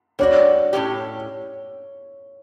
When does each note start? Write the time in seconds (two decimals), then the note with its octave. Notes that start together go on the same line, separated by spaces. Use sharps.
0.19 G3 D4 F#4 C#5
0.73 A2 F#3 C#4 G4